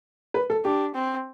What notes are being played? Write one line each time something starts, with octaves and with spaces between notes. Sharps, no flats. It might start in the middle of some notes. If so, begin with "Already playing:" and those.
B4
A4
D4 G4
C4